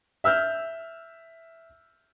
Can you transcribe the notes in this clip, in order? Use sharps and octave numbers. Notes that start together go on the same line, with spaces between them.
E5 E6 F6 G6